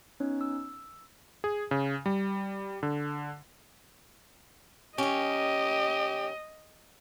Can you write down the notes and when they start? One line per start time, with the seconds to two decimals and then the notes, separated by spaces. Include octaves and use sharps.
0.20 B3 C#4 D#4 C#5
0.41 E6
1.44 G#4
1.71 C#3
2.06 G3
2.83 D3
4.98 D#3 C#4 G4 D#5